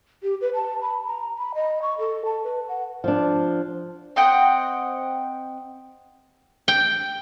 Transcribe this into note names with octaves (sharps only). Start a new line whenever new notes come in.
G4
B4
A5
B5
A#5
B5
D#5
C#6
A4
A5
B4
F#5
F3 D4
C4 D#5 F#5 G5
G5